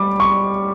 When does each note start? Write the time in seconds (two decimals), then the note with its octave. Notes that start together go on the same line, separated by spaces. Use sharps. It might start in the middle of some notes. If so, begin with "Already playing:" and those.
Already playing: G3 D6
0.20 C#6